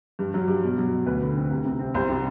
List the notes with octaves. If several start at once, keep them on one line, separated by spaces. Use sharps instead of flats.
G2
F#3
G2
B2
F#3
B2
D2 B4
D3
C4
C2
C3
C4
C2 C5
C3